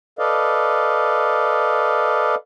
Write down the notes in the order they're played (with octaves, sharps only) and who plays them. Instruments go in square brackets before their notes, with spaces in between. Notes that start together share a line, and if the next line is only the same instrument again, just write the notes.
[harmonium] A4 B4 D5 D#5 F5